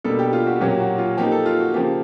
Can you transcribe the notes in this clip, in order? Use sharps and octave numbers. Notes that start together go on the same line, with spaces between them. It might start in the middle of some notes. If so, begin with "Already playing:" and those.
B2 G3 A#3 D4 A4
G4
F4
F#4
A#2 F#3 A#3 C#4 G4
F#4
F4
F3 A#3 D#4 G4
A4
F4
F#4
C#3 F3 A#3 G4